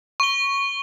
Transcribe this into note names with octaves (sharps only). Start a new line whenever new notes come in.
C#6 G7